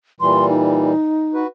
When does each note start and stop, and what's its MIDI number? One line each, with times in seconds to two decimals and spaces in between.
0.20 0.93 46
0.20 0.93 52
0.20 0.93 55
0.20 0.48 84
0.50 1.44 63
1.34 1.47 66
1.34 1.47 71